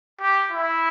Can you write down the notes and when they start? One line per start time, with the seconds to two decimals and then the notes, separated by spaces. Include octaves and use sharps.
0.21 G4
0.52 E4